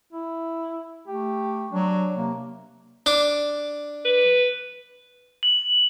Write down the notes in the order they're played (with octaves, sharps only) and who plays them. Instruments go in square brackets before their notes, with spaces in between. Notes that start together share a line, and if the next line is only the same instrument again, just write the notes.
[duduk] E4
[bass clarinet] A3 [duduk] G4
[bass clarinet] F#3 [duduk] D4
[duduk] C3 [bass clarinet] A#3
[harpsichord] D4 D6
[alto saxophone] B4
[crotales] F#7